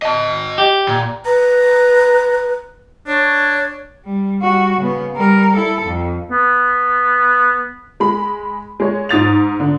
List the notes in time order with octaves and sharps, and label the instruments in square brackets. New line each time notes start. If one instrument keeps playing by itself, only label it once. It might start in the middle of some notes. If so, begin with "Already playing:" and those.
[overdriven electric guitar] D#5 A5
[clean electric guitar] G4
[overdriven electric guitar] A#2
[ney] B4 [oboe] A#5
[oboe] D4 [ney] C#5
[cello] G3
G3 F#4
C#3 B3
G3 A#4
E4 A4
F2
[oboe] B3
[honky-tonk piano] G#3 B5
G#3 C#5
G#2 D#6 A6 F7
D3